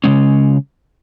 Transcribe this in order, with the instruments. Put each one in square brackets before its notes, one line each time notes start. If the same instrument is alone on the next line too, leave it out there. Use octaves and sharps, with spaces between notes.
[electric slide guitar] C#3 G#3 C#4